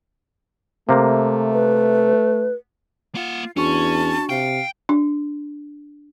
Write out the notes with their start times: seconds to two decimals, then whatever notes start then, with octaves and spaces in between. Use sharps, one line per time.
0.89 C3 A3 A#3
1.53 B4
3.15 A#3 F4 F#5
3.57 E2 C#4 D4 F#4 A5 C#6
4.29 C3 F5 G5
4.89 D4